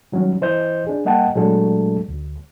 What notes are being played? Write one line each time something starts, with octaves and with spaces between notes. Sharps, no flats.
D#3 F#3 G3 C#4
E3 C5 D#5 G6
D4 G#4
G3 A#3 D#5 F#5 G5 A5
A#2 F#3 G#3 A3 D4 A4
D2